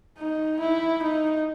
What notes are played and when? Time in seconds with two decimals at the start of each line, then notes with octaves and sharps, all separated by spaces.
0.18 D#4
0.60 E4
1.02 D#4